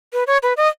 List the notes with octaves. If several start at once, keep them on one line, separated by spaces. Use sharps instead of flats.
B4
C#5
B4
D#5